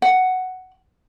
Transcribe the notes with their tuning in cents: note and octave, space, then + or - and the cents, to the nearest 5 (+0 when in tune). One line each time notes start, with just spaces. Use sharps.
F#5 +5